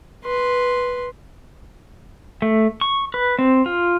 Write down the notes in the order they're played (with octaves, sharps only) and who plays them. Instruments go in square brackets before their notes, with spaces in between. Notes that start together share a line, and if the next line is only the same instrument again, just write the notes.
[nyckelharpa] B4 C6
[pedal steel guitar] A3
C#6
B4
C4
F4